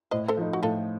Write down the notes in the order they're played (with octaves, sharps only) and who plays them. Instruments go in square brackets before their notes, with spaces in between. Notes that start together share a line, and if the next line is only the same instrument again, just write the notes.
[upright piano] A2 [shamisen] C5 D#5
[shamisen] A4 C5
[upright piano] F3 A3 D#4
[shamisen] F#4
[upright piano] A2 [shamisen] F4 A4